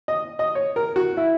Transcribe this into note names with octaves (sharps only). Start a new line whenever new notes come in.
D#5
D#5
C#5
A#4
F#4
E4